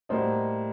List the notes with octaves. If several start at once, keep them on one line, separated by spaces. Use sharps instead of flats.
A2 G3 A#3 F#4 C5 D#5